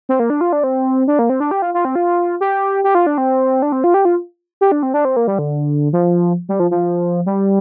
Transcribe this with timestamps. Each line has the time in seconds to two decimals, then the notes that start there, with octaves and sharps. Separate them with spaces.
0.09 C4
0.20 A#3
0.30 D4
0.41 F4
0.53 D4
0.64 C4
1.08 D4
1.19 A#3
1.30 C4
1.40 D4
1.51 G4
1.62 F4
1.74 F4
1.85 C4
1.96 F4
2.41 G4
2.84 G4
2.95 F4
3.07 D4
3.18 C4
3.62 D4
3.72 C4
3.84 F4
3.94 G4
4.05 F4
4.61 G4
4.72 D4
4.83 C4
4.94 D4
5.05 C4
5.16 A#3
5.27 G3
5.39 D3
5.93 F3
6.49 G3
6.60 F3
6.71 F3
7.26 G3